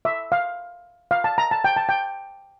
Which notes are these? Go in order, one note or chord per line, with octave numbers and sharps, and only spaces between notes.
E5
F5
F5
A5
A#5
A5
G5
A5
G5